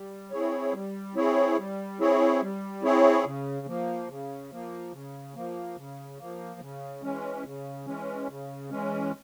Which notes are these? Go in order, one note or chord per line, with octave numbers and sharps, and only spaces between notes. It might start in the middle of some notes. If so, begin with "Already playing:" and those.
Already playing: G3
C4 E4 G#4 C#5
G3
C4 E4 G#4 C#5
G3
C4 E4 G#4 C#5
G3
C4 E4 G#4 C#5
C#3
F3 A#3
C#3
F3 A#3
C#3
F3 A#3
C#3
F3 A#3
C#3
E3 G#3 C#4
C#3
E3 G#3 C#4
C#3
E3 G#3 C#4